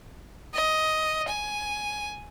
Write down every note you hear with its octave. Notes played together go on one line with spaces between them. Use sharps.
D#5
G#5